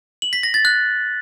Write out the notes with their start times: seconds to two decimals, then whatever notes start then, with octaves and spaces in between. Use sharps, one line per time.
0.22 F#7
0.33 B6
0.43 A#6
0.54 A6
0.65 F#6